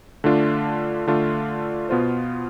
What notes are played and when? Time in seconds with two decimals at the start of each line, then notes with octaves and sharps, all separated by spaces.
0.24 D3 A3 D4 F4
1.07 D3 A3 D4 F4
1.89 B2 B3 F4 C5